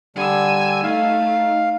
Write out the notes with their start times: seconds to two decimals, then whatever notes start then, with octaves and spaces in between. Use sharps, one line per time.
0.16 D3 G3 G#5 E6
0.83 A3 D#4 F5